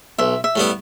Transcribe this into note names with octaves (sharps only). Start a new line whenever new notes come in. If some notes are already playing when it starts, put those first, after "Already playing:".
B1 E5
E5
A2 G3 B3 E4